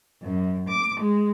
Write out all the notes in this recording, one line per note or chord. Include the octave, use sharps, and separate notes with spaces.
F#2
D6
G#3